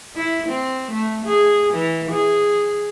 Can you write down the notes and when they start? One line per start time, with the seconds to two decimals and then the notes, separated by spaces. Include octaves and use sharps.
0.16 E4
0.49 C4
0.91 A3
1.26 G#4
1.74 E3
2.11 G#4